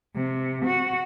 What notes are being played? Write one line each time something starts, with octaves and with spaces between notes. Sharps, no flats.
C3
F#4